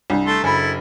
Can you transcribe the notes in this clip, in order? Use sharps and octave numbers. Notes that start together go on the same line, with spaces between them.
C2 D4 F4
A3 A5 C6
F#1 E4 A4 G#5 B5